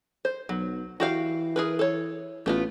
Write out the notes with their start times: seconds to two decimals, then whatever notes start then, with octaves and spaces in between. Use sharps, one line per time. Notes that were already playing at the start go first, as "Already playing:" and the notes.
0.25 C5
0.49 B1 F#3
1.00 E3 F#4 G4 F5
1.56 G#4 A#4 B4
1.79 A4 C#5
2.46 A1 A3 B3 F4